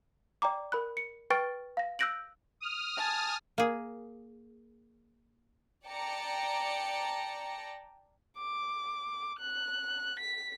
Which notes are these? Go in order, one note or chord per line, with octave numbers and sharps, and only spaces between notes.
D5 G5 A#5 D6
A#4 B5 F#6
C#7
B4 G5 C#6 F6 A6 D7
F5 A#6
E6 F#6 G6 A#6 D7 F#7
D#6 F6
G#5 A5
A#3 G#4
D5 G5 A5 A#5 A#6 C#7
D6
F#6
B6